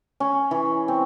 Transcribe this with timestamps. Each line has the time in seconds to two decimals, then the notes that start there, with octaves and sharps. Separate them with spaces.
0.20 C#4
0.51 E3
0.88 C4